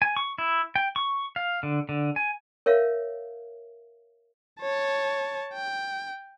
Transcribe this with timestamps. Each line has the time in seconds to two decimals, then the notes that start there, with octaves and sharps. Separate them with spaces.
0.02 G#5
0.17 C#6
0.38 E4
0.76 G5
0.96 C#6
1.36 F5
1.63 D3
1.89 D3
2.16 G#5
2.66 A#4 C#5 E5 F5
4.62 C#5 A5
5.53 G5